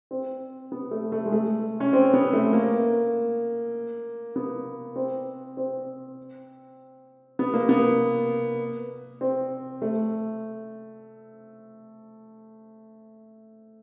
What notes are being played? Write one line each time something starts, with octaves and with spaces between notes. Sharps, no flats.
C4
B3
A3
A3
G#3
A3
C#4
C4
B3
A3
A#3
B3
C4
C4
B3
A#3
B3
C4
A3